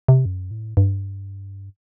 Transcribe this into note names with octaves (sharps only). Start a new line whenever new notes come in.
C3
F#2
A2
G2